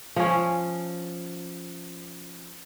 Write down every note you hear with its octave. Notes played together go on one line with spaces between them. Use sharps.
F3 C#4